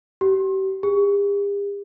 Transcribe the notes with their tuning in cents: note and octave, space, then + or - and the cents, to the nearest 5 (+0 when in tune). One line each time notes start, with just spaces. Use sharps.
G4 -35
G4 +45